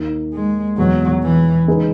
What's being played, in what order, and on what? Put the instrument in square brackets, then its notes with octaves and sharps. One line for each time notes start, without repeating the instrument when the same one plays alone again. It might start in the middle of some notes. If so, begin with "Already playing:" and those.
Already playing: [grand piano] D#2 D#3 A#3
[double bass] G#3
[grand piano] E2 B2 G#3 [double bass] F#3
[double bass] E3
[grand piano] C#3 G#3 D#4 G#4 B4